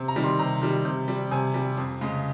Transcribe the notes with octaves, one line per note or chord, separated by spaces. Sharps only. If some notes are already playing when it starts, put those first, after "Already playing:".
Already playing: C3
A#5
D#3 G3
C6
C3 A#5
D#3 G3
C3
G3
C3 G#5
G3
F2
C#3 G#3